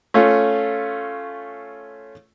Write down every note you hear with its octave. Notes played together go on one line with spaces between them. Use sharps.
A3 C#4 F4